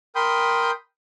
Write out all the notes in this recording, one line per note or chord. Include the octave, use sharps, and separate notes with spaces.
A#4 G5 B5 C6 D#6 G6